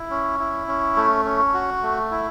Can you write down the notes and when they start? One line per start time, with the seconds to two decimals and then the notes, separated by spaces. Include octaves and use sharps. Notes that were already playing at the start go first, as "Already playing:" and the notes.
Already playing: E4
0.10 C#4
0.40 E4
0.68 C#4
0.96 A3
1.25 C#4
1.54 F#4
1.82 A3
2.11 E4